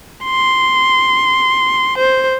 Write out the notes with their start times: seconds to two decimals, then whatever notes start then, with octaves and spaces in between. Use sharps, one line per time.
0.24 C6
1.98 C5